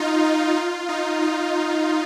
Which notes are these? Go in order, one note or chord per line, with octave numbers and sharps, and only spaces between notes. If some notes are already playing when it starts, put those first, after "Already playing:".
Already playing: D#4 F4
D#4
F4
D#4
D#4